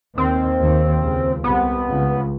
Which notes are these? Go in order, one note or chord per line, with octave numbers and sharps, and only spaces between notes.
D#2 D#3 C4
D#2 D#3
C#2 C#3
C2 C3 B3
C#2 C#3